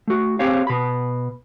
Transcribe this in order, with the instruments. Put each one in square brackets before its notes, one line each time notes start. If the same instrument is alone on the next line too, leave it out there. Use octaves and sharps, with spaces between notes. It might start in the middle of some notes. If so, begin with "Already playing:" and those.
[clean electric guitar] A3 F#4
C4 G4 C5 C#5 F5
B2 B5